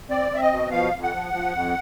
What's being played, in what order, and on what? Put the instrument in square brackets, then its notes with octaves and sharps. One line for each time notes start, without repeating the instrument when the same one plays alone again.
[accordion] C4 D5
C4 E5
D#5
B2
F3 F5
F2
F#5
F3
F3
F2